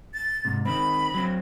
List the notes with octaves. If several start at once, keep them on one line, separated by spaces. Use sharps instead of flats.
A6
G#2 C3
D#3 C4 B5
F#3 C4